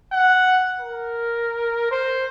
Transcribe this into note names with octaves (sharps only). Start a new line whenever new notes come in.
F#5
A#4
C5